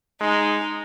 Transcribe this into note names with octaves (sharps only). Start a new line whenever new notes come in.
G#3 D#4